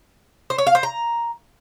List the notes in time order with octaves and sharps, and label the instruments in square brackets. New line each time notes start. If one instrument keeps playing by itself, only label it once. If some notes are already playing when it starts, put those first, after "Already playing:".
[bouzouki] C5
C#5
F5
C5
A#5